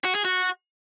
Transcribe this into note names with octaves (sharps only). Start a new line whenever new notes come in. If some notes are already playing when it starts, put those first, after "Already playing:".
F#4
G#4
F#4